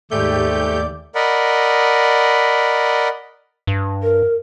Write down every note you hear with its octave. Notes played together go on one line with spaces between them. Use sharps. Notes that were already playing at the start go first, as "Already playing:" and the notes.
D#2 G#2 A3 G4 D5 G6
A#4 D5 D#5 F#5 B5
G2
A#4